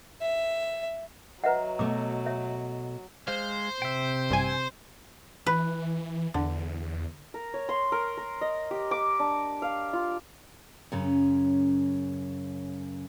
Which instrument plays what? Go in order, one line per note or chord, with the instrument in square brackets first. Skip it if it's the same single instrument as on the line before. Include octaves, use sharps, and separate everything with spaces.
[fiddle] E5
[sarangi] F#3 [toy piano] B4 E5 F#5 [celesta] D#5 A#5
[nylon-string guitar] B2 A3 [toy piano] D6
[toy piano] C#5 E5
[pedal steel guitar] G#3 F5 [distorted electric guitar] C5
[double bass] C3 [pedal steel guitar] E5 G5
[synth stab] A1 G2 G#5
[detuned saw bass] E3 [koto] B4
[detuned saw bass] E2 [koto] D3
[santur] A#4
C#5
C6
A#4
A#4
D#5
G4
D6
D4
F5
F4
[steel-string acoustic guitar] F#2 C#3 C#4